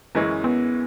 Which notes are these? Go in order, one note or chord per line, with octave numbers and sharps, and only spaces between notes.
F#2 E3 G#3 C#4
B3